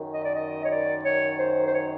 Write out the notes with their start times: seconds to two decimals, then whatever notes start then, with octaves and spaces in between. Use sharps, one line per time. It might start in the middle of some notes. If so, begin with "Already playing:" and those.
Already playing: F#2 D#3
0.11 D#5
0.22 D5
0.34 D#5
0.63 C#5
0.69 D5
1.03 C#5
1.38 C5
1.67 C5
1.73 C#5